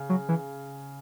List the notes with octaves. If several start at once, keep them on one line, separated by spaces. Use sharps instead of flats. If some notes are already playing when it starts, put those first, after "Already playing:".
Already playing: C#3
F#3
E3